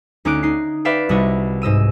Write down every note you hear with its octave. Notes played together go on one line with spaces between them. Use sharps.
D2 C#4 D#4 D6 F#6 D7
D#4 C7
B4 D5 E5 F5 G5
C2 C3 F#4 D#5 C#6
G#2 D#5 E6 D#7